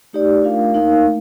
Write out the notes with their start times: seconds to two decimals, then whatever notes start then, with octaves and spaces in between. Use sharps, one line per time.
0.13 A3 D#4 G4 D5
0.43 A3 D4 F4 A#4 F5
0.74 A#3 D#4 A#4 F5
1.05 A3